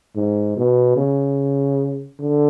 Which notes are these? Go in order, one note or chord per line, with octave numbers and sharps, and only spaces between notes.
G#2
B2
C#3
D3